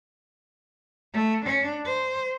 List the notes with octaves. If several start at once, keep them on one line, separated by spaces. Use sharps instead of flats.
A3
D4
C5